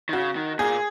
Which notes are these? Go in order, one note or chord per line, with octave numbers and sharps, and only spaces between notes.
D#3
C#3 F#4
D#3
A#2 G#4